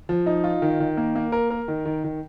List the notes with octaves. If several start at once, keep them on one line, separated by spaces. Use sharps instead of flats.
F3
D#4
F4
D#3
D#3
A#3
A#3
A#4
A#4
D#3
D#3
D#3